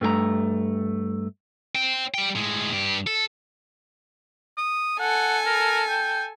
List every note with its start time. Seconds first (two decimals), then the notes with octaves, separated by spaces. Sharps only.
0.01 G2 A3 G4 A#5
1.75 C5 G5
2.14 G3 G5
2.35 A2 G#3
2.72 G2 G4
3.07 A4
4.58 D#6
5.00 A4 F#5 G#5
5.46 A#4
5.89 G5